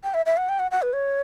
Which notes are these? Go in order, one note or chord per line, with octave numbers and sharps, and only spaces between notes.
G5
E5
E5
F#5
G5
F#5
F#5
B4
C#5